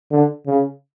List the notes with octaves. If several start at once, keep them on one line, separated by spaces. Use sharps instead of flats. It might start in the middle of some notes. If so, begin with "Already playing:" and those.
D3
C#3